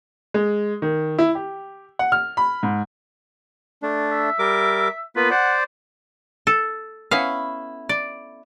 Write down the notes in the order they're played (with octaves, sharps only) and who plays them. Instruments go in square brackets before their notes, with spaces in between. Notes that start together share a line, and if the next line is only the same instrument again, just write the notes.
[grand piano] G#3
D#3
E4
G4
F#5
F6
B5
G#2
[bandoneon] A3 D4
[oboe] E5
[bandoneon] G3 A#4 D6
[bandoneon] A#3 B3 F4 [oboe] B4
[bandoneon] C5 D5 [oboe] F#5
[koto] A4
[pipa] B3 C#4 E4 [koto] F5
[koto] D5